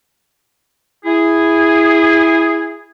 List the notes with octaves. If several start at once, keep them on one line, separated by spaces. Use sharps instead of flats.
E4 G#4